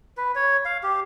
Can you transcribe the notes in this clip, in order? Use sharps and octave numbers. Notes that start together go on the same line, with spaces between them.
B4
C#5
F5
G4